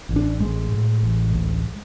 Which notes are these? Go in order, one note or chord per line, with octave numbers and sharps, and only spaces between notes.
A1
D4
A2 G#3
A2
A1
D2